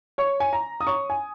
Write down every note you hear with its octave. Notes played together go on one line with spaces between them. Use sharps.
C#5 C#6
G#5
A#5
D#6
C#5 C#6
G#5